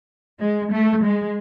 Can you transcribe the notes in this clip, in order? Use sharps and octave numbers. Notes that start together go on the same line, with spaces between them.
G#3
A3
G#3